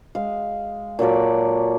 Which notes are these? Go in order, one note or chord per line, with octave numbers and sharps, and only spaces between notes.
G#3 F5
A#2 F#3 A4 D5